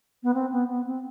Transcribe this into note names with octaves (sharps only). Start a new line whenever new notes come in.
B3
C4
B3
B3
C4